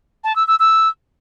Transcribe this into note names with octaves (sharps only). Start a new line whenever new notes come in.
A5
E6
E6
E6